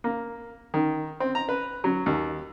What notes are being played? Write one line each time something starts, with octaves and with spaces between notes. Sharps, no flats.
A#3
D#3
C4
A#5
B4
F#3
D#2